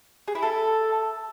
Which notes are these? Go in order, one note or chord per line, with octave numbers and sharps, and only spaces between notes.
G#4
E4
A4